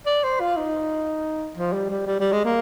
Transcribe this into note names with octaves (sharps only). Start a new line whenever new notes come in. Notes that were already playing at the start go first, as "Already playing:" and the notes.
D5
C5
F4
D#4
F3
G3
G3
G3
G3
G#3
A#3